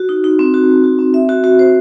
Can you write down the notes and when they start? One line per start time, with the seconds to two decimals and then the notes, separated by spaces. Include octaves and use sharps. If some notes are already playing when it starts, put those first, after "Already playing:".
Already playing: F#4
0.09 D#4
0.24 D#4
0.39 C4
0.54 F#4
0.69 F#4
0.84 F#4
0.99 C4
1.14 E5
1.29 F#4
1.44 F#4
1.59 C5